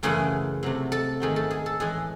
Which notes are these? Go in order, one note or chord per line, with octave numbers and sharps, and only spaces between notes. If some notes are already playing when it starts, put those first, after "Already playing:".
F#2 C#3 E3 A3 G#4
C3 F#3 A3
A4
G#2 D#3 F#3 A3 G#4
A4
G#4
A4
A2 E3 G#3 G#4